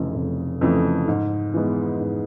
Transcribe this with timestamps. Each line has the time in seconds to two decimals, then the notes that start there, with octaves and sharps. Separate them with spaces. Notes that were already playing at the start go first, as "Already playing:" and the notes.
Already playing: F1 F2 C#3 E3 A3
0.15 F1
0.61 F2 C#3 E3 A3
1.08 G#2
1.54 E3 G#3 B3
2.00 G#2